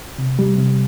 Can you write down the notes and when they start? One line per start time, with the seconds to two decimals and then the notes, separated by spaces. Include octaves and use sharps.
0.18 C3
0.39 G3
0.58 C3